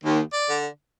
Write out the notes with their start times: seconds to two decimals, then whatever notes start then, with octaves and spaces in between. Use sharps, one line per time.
0.05 D#2
0.33 D5
0.48 D3